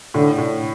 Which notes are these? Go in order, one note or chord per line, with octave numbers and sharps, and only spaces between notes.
A2 D3
A2